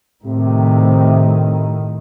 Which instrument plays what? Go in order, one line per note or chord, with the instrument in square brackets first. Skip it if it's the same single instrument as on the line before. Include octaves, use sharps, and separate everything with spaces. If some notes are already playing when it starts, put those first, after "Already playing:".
[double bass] A2 D#3 [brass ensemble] C3